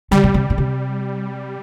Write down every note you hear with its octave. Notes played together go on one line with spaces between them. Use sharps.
D3 G3
B2
C3
B2
C3